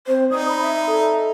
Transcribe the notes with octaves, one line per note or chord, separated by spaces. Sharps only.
C4 C5
D#4 D5 D#6
B5
E5
A4